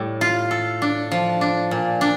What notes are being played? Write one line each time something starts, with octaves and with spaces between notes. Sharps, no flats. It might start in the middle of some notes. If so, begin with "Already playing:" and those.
Already playing: A2 G3
F4
A4
D4
F3
D4
A#2
D4